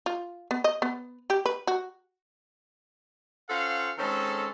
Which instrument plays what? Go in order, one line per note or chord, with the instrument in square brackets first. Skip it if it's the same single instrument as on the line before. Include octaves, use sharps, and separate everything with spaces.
[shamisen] F4
B3
D#5
B3
G4
B4
F#4
[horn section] C#4 F4 A4 C5 F5 F#5
D#3 G#3 C4 C#4 A4